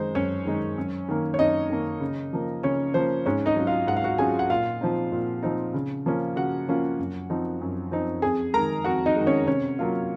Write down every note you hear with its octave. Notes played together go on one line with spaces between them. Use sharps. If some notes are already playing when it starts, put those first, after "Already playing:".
Already playing: F#2 D#3 G#3 D#4 C5
F#2 C#4 C#5
D#3 G#3 D#4
F#2
D#3 A#3
C#5
F#2 D#4 D#5
D#3 A#3
C#3
F3 A#3
C#3 C#4 C#5
F3 A#3 C5
G#2 C#4 C#5
D#4 D#5
F#3 C#4 F4
F4 F5
G#2 F#5
F5
F#4 F#5
F#3 C#4 F4 G#4 G#5
F#5
A#2 F4 F5
F3 C4 D#4
A#2
F3 C4 D#4
C#3
F3 A#3 C#4 F4
C#3 F#4 F#5
F3 A#3 C#4 F4
F#2
F3 C4 D#4
F#2
F3 C4 D#4
F2 G#4 G#5
D#3 G#3 A#4 A#5
F2 F#4 F#5
D#4 D#5
D#3 G#3
C#4 C#5
C3 C#4 C#5
F#3 A#3 F4